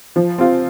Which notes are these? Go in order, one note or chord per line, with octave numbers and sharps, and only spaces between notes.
F3
C4 F4